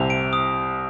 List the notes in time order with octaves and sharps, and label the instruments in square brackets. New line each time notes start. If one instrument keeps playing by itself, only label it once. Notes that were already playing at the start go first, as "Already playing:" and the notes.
Already playing: [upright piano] C2 C3 [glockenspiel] F7
[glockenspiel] D7
D#6